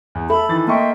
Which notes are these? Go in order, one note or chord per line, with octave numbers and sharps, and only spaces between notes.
E2
A4 E5 B5
D#3 E3 A6
A#3 D#5 E5 G5 C6 C#6